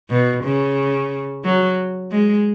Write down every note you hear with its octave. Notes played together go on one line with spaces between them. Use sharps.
B2
C#3
F#3
G#3